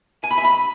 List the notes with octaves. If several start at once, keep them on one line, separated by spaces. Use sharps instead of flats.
G#5
B5
E5
B5